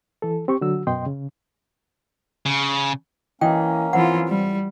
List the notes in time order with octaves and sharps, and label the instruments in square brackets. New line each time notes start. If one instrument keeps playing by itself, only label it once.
[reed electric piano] E3 A4
C4 G4 C#6
D3 F#3 F#4 E6
F#2 B2 D#5 G5 C6
C#3
[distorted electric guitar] C#3
[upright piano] E3 D#5 [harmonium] A#3 C#4 [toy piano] G5
[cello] E3 F4 [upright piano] C4 [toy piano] F#5
[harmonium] A2 [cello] G3